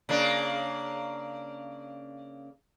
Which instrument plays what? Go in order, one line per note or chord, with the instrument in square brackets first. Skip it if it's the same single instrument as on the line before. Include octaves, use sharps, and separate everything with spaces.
[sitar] C#3 A#3 D4